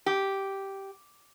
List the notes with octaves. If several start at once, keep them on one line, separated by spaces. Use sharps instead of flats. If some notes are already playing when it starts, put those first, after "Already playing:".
G4